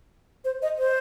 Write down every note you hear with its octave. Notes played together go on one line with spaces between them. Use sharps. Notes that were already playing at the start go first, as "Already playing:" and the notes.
C5
D#5
C5